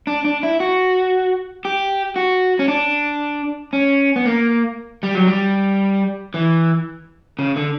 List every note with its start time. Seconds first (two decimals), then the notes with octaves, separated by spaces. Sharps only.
0.07 D4
0.25 D4
0.43 E4
0.60 F#4
1.65 G4
2.16 F#4
2.59 C#4
2.68 D4
3.73 C#4
4.16 B3
4.26 A#3
5.03 G3
5.15 F#3
5.27 G3
6.34 E3
7.39 C#3
7.56 D3